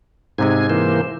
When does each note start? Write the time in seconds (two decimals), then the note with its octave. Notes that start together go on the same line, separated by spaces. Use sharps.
0.38 G#2 C3 G#3 C4 G#5
0.70 E3 A#3 C5